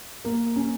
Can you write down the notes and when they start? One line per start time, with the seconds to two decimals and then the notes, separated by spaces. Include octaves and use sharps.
0.25 A#3
0.56 C#4